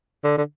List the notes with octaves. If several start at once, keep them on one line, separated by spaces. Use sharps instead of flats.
D3
D3